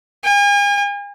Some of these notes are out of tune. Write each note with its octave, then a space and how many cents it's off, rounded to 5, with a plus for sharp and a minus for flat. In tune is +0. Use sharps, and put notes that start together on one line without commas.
G#5 -40